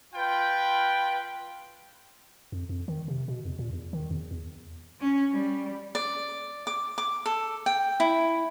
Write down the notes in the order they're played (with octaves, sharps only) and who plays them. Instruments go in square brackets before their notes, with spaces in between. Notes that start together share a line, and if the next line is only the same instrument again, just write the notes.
[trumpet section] F4 B4 G5
[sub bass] F2
F2
D#3
C3
B2
E2
A#2
E2
D#3
E2
E2
[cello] C#4
G3
[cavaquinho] D5
D6
D6
A4
G5
E4